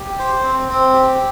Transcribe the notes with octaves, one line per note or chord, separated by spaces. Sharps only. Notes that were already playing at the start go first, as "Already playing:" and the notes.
Already playing: G4
C5
C4
C4
G4